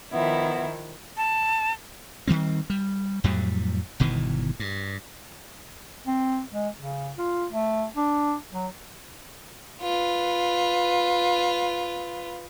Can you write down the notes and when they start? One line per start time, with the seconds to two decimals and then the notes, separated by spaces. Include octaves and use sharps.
0.12 D#3 F3 B3 E4 E5
1.17 A5
2.28 D#3 E3 G3 C4
2.70 G3
3.24 F2 A2 F#3 G3
4.00 G1 B2 D#3 E3
4.60 G2
6.07 C4
6.53 G#3
6.77 C#3
7.17 F4
7.52 A3
7.96 D4
8.52 F#3
9.82 F4 B4